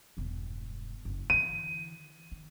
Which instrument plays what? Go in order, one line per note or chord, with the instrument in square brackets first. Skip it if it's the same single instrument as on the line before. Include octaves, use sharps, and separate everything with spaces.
[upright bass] E1 G2
F#1
[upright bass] D3 E3 [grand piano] D#7
[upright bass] D#3